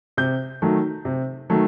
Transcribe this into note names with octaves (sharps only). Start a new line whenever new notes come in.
C3 G6
D#3 F#3 A3
C3
D#3 F#3 A3